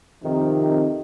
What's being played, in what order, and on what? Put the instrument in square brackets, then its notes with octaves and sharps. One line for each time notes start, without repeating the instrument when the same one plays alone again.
[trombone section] F2 C3 D#3